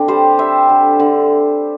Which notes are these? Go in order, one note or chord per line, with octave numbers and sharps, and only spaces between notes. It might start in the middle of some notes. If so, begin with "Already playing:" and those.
Already playing: D3 C4 D4
G3 G4 C5
G3 C5 E5
D3
D3